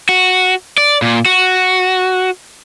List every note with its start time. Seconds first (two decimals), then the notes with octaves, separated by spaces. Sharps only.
0.09 F#4
0.78 D5
1.02 A#2
1.25 F#4